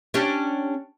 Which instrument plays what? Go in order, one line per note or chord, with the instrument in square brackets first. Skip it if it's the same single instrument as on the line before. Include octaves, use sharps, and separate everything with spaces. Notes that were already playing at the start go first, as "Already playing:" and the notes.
[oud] C#4 D4 G4